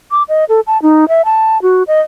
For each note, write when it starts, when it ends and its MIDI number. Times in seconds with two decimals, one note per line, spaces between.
0.11 0.23 86
0.29 0.45 75
0.49 0.60 69
0.67 0.80 81
0.82 1.08 63
1.08 1.25 76
1.25 1.61 81
1.62 1.83 66
1.87 2.01 75